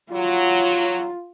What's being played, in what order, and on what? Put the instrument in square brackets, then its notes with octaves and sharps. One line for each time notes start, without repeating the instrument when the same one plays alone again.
[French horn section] F#3 [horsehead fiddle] F4